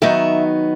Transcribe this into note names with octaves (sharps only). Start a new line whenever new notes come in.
D#3 F#3 B3 D#4 E5